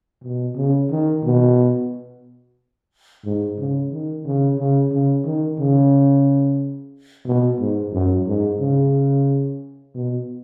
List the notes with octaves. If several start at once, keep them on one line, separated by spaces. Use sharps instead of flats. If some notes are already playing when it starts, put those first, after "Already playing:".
B2
C#3
D#3
B2
G#2
C#3
D#3
C#3
C#3
C#3
D#3
C#3
B2
G#2
F#2
G#2
C#3
B2